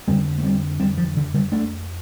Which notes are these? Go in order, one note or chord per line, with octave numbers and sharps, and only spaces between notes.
F2 D3 G3 C4
A3
G3 C4
G3 C4
F3
D3
D3 G3
A3 D4